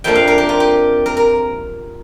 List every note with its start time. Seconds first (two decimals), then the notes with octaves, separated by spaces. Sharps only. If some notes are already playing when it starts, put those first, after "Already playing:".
0.04 F2 C3 F3 A#3 D4 G5
0.15 F5
0.28 A#4
0.38 G4
0.49 F4
0.60 G4
1.06 A#4
1.17 A#4